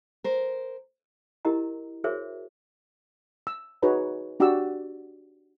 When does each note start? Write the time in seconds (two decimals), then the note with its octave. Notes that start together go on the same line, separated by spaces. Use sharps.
0.24 A#4 C5
1.45 E4 G4 A#4 D#5 A#5
2.04 F#4 G#4 A#4 C5 C#5 E5
3.47 E6
3.82 D#4 F#4 G#4 B4 C#5 A#5
4.40 D4 F#4 G4 D5 F#5 E6